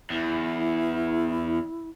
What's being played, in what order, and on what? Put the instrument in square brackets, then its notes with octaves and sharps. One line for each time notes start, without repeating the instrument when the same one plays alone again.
[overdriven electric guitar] E2 [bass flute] E4